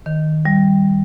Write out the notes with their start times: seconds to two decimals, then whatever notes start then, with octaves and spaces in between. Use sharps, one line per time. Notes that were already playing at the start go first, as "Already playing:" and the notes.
0.06 D#3
0.45 G3